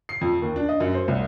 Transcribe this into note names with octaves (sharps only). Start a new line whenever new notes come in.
C7
F2
D#2
D4
D#5
F#2
C5
C2